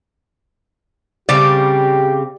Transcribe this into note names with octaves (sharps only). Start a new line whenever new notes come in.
C#3 G3 C4 G4 D5